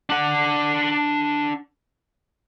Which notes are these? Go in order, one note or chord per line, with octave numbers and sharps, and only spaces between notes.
D4 F#5